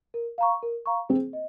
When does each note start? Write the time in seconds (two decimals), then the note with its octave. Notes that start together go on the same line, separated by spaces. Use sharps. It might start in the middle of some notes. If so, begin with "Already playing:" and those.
0.14 A#4
0.38 F5 A#5 C#6
0.63 A#4
0.86 F5 A#5 C#6
1.09 C4 G#4
1.33 D#5